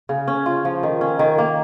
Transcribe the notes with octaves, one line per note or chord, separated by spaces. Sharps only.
C#3
C#4
F4
F3
D#3
C#4
D#3
A#3